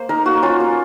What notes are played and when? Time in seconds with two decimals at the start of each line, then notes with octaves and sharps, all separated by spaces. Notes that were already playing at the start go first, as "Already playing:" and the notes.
Already playing: A#3 C5
0.09 D#4 A#4
0.26 A#3 F#4
0.42 C#4 F4
0.60 A#3